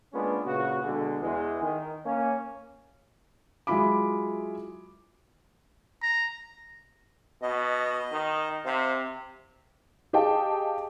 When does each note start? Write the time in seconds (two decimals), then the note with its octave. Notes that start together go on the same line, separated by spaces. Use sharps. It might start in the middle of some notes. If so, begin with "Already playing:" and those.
0.13 G#3 A#3 B3 C#4 D4 F4
0.45 A#2 C#3 B3 F#4
0.84 B2 D3 G#3
1.22 E2 G#3
1.62 D#3
2.05 A#3 C#4
3.67 F#3 G#3 E4 F4 B5 D6
6.02 A#5
7.42 B2 D#5
8.12 D#3
8.66 C3 C5 F5
10.13 G4 G#4 D#5 F5 G5 A5